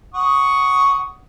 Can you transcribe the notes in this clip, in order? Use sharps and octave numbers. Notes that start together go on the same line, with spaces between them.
F#5 C#6 D#6